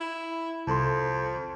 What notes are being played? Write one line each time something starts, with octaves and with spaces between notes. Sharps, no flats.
E4
C2 F2 A4 A5 C6